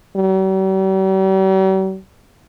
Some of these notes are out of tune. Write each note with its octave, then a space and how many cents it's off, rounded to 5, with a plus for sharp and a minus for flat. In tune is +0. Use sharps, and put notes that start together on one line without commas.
G3 -45